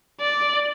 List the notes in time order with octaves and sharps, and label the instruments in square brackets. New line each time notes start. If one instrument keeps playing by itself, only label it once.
[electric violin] D5